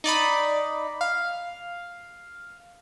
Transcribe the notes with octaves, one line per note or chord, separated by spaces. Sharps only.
D#4 D5 D#5 B5
F5